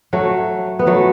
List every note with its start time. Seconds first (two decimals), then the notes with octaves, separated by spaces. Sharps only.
0.13 F#3 A3
0.79 B3
0.87 F#3 A3